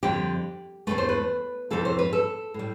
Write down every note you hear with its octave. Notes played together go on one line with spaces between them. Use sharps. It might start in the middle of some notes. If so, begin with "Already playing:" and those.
F2 D3 G3 G4
E2 B2 A3 B4
C5
B4
F2 C3 E3 A3 A4
C5
B4
A4
A2 G3